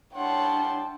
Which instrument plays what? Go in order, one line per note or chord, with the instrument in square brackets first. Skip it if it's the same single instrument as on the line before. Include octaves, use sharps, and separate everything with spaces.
[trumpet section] G3 E4 C6 [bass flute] D4 [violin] C#5 F#5 [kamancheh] G5 A5